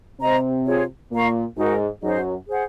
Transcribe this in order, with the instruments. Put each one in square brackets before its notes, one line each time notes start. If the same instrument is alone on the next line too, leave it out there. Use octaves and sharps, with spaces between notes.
[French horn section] C3 C4 [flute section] C5 D#5 A#5
[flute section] F4 G#4 C#5
[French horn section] A#2 A#3 [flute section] A#4 F5 A#5 C#6
[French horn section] G#2 G#3 [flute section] D#4 F#4 A#4
[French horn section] F#2 F#3 [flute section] D#4 G#4 C5 D#5
[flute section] G#4 C5 F#5